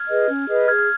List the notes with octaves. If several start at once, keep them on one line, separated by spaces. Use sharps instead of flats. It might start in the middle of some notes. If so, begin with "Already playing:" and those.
Already playing: F6 G#6
G#4 B4 D#5
C#4
G#4 B4 D#5
G#4 F6 G#6
F6